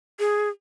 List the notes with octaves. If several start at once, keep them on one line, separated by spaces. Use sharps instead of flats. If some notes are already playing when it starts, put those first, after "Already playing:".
G#4